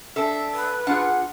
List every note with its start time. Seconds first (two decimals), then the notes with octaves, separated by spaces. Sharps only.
0.16 D4 A4 E5 A5
0.54 B4
0.87 D4 F4 G#4 F#5